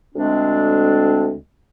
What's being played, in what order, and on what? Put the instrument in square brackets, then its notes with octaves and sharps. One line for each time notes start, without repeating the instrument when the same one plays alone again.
[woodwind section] D2 G#3 C4 D4